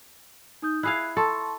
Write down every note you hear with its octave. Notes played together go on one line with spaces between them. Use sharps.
D#4 D#6 G6
E4 G#4 F5 F#6
A4 A5 C6 C#6